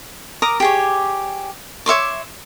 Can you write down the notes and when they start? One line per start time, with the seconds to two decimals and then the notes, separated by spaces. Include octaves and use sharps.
0.42 A#4 A#5 D6 D#6
0.60 G4 G#4 C#5
1.86 C#5 E5 C6 D6